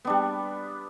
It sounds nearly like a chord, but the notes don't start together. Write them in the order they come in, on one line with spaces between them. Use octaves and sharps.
B3 D4 G3